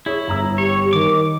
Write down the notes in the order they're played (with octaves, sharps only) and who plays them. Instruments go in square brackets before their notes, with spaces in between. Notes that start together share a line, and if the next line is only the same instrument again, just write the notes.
[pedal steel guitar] E4 [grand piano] G#4 C#5
[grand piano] G1 A#5 E6
[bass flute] G4 [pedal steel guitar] C#5
[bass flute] D#3 [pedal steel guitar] D6